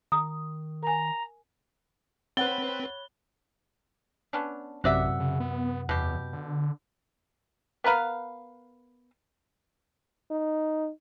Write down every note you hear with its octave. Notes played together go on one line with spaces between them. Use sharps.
D#3 A#5 D#6
A#4 G#5 A#5
C4 B4 C#5 F#5 B5 F#6 A6 G7
B3 C#4 D4
A1 F#2 C3 F#4 D5 E5 F#5
C#3
B3
E2 B2 G4
D3
B3 A#4 B4 F5
D#4